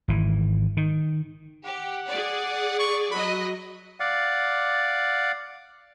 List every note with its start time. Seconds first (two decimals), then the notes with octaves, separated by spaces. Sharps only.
0.08 G#1 E3
0.77 D#3
1.66 G4 F#5
2.08 G#4 D5
2.79 C#6
3.12 F#3 D#5 B5
4.00 D5 F5 F#5